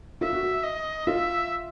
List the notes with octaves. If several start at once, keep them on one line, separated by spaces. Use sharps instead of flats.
F4 E5
F#4
F#4
D#5
F4 E5